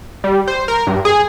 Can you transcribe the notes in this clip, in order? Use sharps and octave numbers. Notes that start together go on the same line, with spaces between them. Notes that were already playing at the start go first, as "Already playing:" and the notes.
G3
C5
A#4
G2
G#4